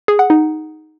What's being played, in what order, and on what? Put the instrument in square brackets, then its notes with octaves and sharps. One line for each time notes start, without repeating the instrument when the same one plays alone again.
[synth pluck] G#4
F#5
D#4